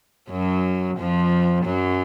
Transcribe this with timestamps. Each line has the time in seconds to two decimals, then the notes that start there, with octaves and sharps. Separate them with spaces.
0.30 F#2 F#3
0.98 F2 F3
1.65 F#2 F#3